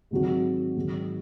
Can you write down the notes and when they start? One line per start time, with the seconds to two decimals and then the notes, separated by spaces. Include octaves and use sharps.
0.11 G#2 D#3 F#3 C4 F#4
0.76 G#2 D#3 F#3